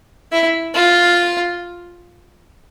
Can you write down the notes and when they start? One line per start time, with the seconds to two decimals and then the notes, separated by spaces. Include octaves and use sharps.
0.32 E4
0.75 F4